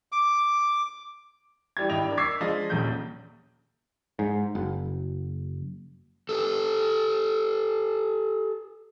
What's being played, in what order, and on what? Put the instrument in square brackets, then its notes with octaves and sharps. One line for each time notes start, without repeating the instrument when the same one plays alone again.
[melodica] D6
[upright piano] E3 G3 G4 G#6
G#1 G2 E4 D#5 G5 F7
D4 A#4
C#6 D6 E6 G#6 B6 C7
F3 G#3 D4 C5 D#5 A6
D#1 A#1 C#4 G6
[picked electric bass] G#2
F#1
[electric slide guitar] G4 A4